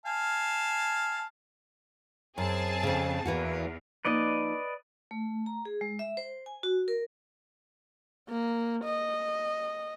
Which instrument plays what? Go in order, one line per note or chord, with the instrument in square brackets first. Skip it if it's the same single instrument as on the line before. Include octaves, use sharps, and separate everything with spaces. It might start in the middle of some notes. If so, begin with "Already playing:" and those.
[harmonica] F5 G#5 A5
[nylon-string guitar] F#2 [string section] C4 G#4 A5
[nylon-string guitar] F2 C#3
[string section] E2 [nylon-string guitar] E3 A#3 F#4
[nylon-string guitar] F3 A#3 D#4 [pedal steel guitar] B4 D5 D#5
[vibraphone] A3
A#5
G#4
G#3
E5
C5
G#5
F#4
A#4
[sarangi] A#3
D#5